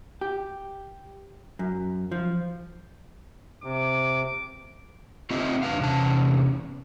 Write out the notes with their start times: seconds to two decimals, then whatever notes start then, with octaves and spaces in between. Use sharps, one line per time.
0.21 G4
1.59 F#2
2.12 F3
3.64 C3 D6
5.31 A3 C4 F4 G4 D#5 E5
5.63 F2 D3 B4 F5
5.79 E2 C3 C#4 A5